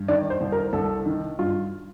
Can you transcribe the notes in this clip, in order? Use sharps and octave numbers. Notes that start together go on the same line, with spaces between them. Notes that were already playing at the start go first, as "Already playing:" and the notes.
Already playing: G2
D#3 D5
C5
C2
A#4
C2 A4
D#3
G2 F4